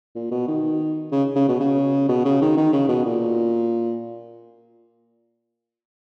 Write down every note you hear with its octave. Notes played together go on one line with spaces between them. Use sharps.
A#2
B2
D#3
C#3
C#3
B2
C#3
B2
C#3
D#3
D#3
C#3
B2
A#2